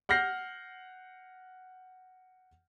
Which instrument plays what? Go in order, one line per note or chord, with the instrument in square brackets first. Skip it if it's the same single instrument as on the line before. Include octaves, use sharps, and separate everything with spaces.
[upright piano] F#5 F6 G6 A#6 C7